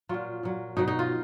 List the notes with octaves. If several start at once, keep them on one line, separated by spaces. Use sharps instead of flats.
A#2 F#3 F4
A#2 F#3
B2 F#3 D#4
D#4
F4